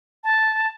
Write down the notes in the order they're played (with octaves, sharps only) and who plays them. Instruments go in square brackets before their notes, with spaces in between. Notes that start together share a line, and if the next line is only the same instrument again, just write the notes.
[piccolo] A5